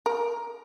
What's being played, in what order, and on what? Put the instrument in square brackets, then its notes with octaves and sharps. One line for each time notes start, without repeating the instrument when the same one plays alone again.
[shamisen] A#4